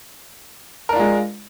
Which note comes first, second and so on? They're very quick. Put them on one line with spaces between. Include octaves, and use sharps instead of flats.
A#4 D4 F4 G#3